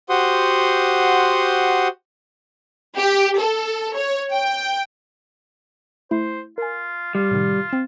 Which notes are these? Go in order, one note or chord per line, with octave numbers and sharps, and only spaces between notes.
F#4 G4 C5 F#5 C6 D#6
G4
A4
C#5
G5
A3 E4 C5
F4 A#4 G#5
G3 F4
A2 C3 D#3
C4 E7